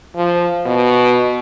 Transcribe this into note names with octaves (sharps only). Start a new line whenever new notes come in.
F3
B2